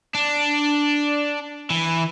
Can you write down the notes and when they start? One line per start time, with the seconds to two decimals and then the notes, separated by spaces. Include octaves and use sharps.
0.15 D4
1.70 E3